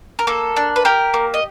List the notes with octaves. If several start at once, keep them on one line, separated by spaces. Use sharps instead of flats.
A#4
A#3 A4
D4
B4
G4 A#4
A#3
D#5